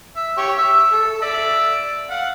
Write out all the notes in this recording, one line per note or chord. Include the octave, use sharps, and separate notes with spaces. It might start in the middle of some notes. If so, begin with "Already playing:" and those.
E5
G4 C#5 C#6
E5 E6
A4
D5 E5
F5 F#5